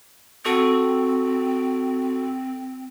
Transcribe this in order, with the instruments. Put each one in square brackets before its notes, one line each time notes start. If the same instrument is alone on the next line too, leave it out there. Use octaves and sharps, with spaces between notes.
[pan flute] C4 [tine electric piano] F#4 A4 C#6